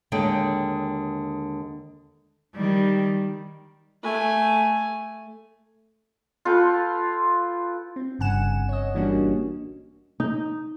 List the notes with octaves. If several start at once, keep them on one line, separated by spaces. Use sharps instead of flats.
D#2 D3 G#3 C#5 G5
D#3 G3
A3 G#5
F4 A4 B4 G5
C4
G1 G2 C#3 F#5 G#5 E7
C#5 D#5
E3 G3 A#3 C#4 D4 F#4
A#1
D#4